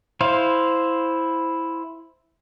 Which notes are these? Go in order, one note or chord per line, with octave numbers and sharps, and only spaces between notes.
E4 C5 F5